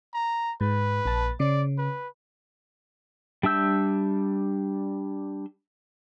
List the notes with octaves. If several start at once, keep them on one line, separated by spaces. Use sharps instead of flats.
A#5
G#2 B4
A#1 A5
C#3 D5
B4
G3 D4 E5 E6 G6